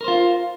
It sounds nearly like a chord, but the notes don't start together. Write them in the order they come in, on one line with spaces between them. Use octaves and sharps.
A#4 C5 F4